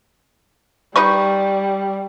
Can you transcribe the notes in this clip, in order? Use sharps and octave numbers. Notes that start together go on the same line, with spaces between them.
G3 D#4 B4 C#6